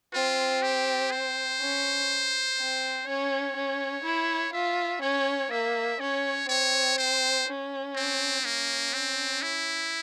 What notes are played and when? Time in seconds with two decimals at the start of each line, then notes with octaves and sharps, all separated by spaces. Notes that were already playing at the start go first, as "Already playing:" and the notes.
0.13 C4 F4
0.62 G4
1.11 C5
1.60 C#4
2.58 C4
3.07 C#4 C#5
3.56 C#4
4.05 E4
4.53 F4 E5
5.02 C#4 C#5
5.51 A#3 E5
6.00 C#4 C#5
6.49 C4 C#5
6.98 C5
7.47 C#4
7.96 C4
8.45 A#3 C#4
8.93 C4
9.42 E4